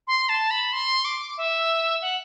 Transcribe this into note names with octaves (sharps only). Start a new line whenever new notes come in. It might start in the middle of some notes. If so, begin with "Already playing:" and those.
C6
A5
B5
C6
D6
E5
F#5